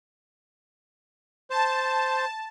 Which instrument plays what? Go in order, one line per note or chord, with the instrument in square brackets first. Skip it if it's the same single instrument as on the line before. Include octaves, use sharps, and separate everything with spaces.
[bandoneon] C5 [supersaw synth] A5